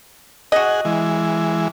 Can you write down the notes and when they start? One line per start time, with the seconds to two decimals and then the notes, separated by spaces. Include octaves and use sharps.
0.52 F#4 G#4 D#5 F#5
0.85 E3 G#3